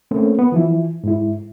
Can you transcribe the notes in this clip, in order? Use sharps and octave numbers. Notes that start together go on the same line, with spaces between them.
A3 A#3 C4 C#4
B3
E3 F3 E4
G#2 E4